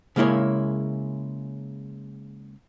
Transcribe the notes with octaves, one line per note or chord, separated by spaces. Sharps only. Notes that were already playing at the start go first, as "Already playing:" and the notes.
C#3 G#3 A#3 E4 C#5